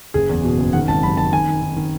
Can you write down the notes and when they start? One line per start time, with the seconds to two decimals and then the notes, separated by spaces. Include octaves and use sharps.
0.14 F#1 G#4
0.29 E2
0.43 B2
0.58 F#1
0.73 D#3 F#5
0.88 G#1 A5
1.02 F#2 B5
1.17 D#3 A5
1.32 D#3 G#5
1.48 D#3
1.62 D#3
1.76 D#3